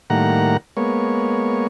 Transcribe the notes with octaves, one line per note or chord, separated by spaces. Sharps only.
A2 D#3 G3 A#3 F#5 A#5
G#3 A#3 B3 C#5